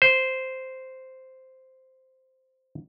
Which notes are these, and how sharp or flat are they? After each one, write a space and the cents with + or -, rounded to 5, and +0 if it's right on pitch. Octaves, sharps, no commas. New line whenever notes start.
C5 -5